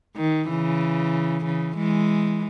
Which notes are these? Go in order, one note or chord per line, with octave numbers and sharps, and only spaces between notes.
D#3
C#3 E3
C#3 E3
E3 G#3